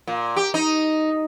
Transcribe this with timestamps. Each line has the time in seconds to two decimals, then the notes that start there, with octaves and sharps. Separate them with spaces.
0.07 A#2
0.36 G4
0.54 D#4